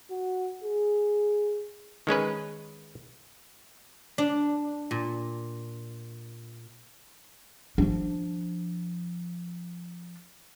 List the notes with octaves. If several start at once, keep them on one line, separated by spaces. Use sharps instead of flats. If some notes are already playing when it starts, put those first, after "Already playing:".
F#4
G#4
D#3 G#3 C#4 B4
D4
A#2
F3 D4